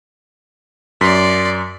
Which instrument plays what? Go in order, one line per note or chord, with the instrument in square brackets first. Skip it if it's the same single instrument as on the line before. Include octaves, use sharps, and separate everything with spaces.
[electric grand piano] F#2 B6 [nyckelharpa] D5 C6